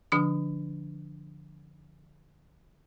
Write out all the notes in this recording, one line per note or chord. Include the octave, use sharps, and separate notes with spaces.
D3 F3 D4 D#6